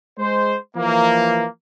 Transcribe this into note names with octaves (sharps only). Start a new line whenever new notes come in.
G#3 C5
E3 F3 A#3